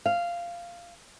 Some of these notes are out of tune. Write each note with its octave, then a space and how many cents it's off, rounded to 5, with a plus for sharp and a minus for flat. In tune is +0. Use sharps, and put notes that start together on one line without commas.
F5 -10